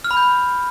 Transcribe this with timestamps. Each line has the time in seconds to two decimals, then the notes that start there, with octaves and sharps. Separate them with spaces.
0.04 F6
0.11 B5
0.17 G6